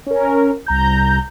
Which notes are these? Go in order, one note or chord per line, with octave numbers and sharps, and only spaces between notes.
C#4 A#4
C2 A#5 G6